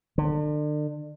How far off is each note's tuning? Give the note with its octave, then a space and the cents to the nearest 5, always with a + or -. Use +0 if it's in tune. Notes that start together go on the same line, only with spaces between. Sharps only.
D3 +35